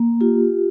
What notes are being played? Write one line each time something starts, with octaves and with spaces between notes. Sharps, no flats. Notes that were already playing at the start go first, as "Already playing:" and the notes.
Already playing: A#3
F4 G4